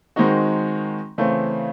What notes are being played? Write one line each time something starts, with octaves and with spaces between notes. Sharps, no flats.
D#3 G#3 C4 D#4 F#4
C#3 E3 A3 C4